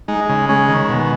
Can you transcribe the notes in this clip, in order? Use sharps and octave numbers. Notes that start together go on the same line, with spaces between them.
G#3 D#4
C#3
G#3 C#4
D#3
B2